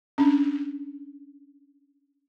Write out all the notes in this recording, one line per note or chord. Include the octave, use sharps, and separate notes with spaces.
C#4 D4